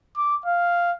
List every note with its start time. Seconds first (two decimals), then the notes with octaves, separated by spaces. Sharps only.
0.17 D6
0.46 F5